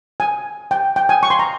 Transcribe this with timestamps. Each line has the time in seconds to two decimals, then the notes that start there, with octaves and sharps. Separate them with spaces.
0.20 G#5
0.71 G5
0.96 G5
1.09 G#5
1.23 C#6
1.30 C6
1.39 A#5